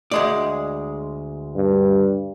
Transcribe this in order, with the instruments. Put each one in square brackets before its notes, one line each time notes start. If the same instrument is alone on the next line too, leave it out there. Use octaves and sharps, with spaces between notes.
[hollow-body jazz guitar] D2 G#3 D5
[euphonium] G2